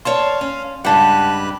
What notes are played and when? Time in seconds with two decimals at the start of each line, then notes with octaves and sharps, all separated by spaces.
0.05 C#5 D5 F5 A5 C6
0.41 C#4
0.85 G2 C#3 G#3 G4 B4 F#5 A5 F#6